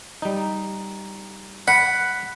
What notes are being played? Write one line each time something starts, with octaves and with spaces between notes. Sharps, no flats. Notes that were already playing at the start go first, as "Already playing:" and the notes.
G3 D#4
F#5 B5